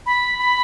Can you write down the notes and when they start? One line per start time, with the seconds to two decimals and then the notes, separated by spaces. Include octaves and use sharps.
0.06 B5
0.39 B5